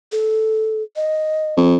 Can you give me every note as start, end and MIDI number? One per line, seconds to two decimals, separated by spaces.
0.12 0.83 69
0.96 1.55 75
1.57 1.78 41